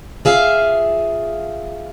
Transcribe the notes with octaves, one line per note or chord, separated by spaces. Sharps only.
F4 G#4 E5 F5